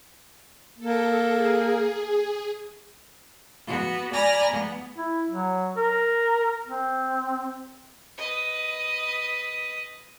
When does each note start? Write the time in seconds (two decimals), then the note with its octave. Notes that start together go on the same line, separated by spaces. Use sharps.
0.79 A#3 A4
1.34 G#4
3.67 B3 F#4
4.13 D5 G#5 A#5 B5 F6 A#6
4.50 B3
4.97 E4
5.29 F#3
5.77 A#4
6.67 C4
8.18 B4 D#5